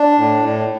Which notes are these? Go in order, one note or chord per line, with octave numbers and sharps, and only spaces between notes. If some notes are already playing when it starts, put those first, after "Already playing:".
Already playing: D4
A2
A2